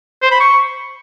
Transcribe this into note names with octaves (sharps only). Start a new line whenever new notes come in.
C5
B5
C#6